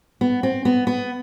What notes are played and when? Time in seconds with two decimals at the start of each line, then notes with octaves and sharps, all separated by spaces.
0.21 B3
0.43 C4
0.65 B3
0.87 B3